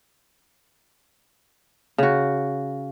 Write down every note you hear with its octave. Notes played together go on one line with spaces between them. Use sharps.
C#3 F#4